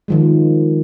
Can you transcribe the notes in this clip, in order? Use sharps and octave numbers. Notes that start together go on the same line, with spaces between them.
D#3 F3 G#3